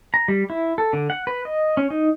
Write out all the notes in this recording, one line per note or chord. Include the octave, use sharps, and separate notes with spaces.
A#5
G3
E4
A4
D3
F#5
B4
D#5
C#4
D#4